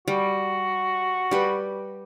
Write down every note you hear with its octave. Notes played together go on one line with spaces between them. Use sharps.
G3 F#4
G3 G4 B4